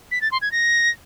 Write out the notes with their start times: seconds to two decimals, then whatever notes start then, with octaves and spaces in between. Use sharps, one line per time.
0.11 B6
0.21 A6
0.31 C6
0.42 G#6
0.52 A#6